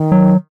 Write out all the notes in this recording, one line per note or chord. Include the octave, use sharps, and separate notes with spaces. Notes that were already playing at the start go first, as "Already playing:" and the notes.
Already playing: D#3
F#3